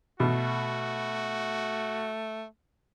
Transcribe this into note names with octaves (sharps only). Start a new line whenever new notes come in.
B2 A3 F#4